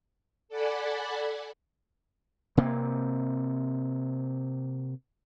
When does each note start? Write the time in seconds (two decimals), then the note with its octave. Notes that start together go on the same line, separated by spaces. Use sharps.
0.49 A4 D5 F#5 G#5 B5
2.57 C3 A#3 C4